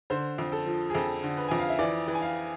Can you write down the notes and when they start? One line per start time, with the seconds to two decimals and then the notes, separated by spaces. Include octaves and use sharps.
0.10 D3 C5
0.38 F2
0.52 A4
0.66 F3
0.90 G#4
0.94 F2 A4
1.23 D3
1.37 B4
1.48 F2 G#5
1.59 F5
1.69 E5
1.79 E3 D5
2.08 E3
2.15 G#5
2.22 F5